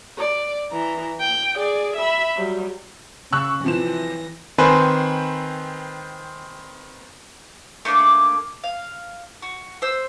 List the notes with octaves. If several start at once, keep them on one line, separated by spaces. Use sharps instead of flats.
D5
E3 A#5
G5
G#4 D5
E5 B5
F#3 G3
C#3 C#6 E6 F#6
C3 E3 F3 A#6 E7
D#3 C4 B4 C5 G#5
A3 A#3 D4 D5
F5
F#4
C5 E6